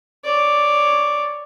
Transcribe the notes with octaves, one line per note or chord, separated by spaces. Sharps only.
C#5 D5